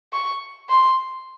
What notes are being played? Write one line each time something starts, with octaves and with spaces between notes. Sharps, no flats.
C#6
C6